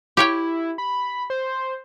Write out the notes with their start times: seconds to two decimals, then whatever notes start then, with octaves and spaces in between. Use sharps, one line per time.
0.17 E4 G4 C#5 G5
0.78 B5
1.30 C5